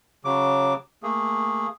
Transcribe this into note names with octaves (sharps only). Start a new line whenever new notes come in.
C#3 F#3 D6
A3 A#3 G#4